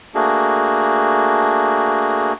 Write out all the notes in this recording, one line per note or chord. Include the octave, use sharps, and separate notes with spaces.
A3 A#3 D4 F#4 G#4